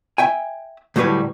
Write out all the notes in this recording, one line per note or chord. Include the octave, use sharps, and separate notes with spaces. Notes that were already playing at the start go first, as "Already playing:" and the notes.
E5 G5 G#5
D2 A2 F#3 G3 B4 C#5